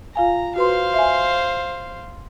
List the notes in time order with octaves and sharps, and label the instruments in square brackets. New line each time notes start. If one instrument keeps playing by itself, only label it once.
[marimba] F4 F5 G#5 [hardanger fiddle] A#5
[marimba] F#4 B4 C6 [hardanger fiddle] C5 F5
[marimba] E5 G#5